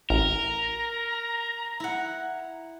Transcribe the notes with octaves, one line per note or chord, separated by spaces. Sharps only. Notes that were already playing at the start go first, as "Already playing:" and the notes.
A1 A#4 A#5
E4 F#5